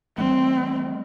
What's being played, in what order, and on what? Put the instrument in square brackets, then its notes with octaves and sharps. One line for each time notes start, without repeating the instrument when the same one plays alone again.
[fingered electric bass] E3 G3 A3 [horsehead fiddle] C4